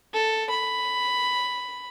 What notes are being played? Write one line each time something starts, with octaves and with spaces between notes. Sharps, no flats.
A4
B5